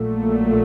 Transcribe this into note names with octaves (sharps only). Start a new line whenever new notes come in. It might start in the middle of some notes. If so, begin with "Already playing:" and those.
Already playing: A#1 A#2 F#3 A3